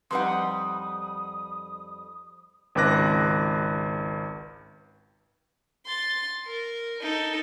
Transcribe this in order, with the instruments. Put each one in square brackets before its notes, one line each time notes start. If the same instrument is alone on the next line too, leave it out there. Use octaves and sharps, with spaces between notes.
[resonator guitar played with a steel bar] F2 G3 F#5 [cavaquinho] D#4 B4 C6 [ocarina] D#6
[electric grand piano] G#1 C#2 B4 D6 F#6 A#6
[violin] C6 A6
A#4
D#4 A4